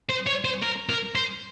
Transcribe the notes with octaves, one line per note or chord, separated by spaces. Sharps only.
C5
C#5
C5
A#4
A#4
C5